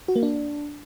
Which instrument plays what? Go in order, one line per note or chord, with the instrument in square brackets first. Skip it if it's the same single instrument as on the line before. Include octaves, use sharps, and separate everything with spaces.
[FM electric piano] F#4
A#3
D4